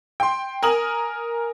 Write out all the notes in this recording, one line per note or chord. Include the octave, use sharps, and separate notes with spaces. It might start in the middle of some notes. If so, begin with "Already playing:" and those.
G5 C6
A#4 G#5 D#6 F#7